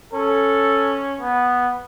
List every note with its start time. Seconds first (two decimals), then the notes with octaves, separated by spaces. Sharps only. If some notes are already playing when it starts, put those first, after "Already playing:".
0.13 C#4 A4
1.21 B3